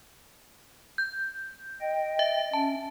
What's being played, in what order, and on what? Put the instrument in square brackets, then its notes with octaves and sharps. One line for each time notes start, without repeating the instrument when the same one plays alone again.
[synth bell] G6
[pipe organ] D#5 G5
[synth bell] E5
[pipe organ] C#4 [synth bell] A5